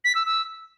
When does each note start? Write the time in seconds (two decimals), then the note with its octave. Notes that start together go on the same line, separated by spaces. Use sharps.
0.04 B6
0.15 E6
0.26 E6